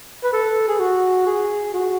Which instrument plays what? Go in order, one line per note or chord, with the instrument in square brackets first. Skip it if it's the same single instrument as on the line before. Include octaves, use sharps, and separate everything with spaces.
[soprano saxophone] B4
A4
G#4
F#4
G#4
F#4